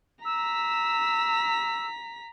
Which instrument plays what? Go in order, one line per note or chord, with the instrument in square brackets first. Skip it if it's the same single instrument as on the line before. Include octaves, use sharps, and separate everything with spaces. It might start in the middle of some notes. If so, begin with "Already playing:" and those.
[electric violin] A#5 B6 [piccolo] E6